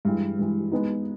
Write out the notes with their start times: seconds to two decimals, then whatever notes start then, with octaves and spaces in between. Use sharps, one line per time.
0.05 G2 E3 G#3
0.39 G2 E3 G#3
0.72 G#3 B3 D#4